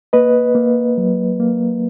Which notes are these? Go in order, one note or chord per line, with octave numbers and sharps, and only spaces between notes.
A#3 B4 D#5
A#3
F#3
A#3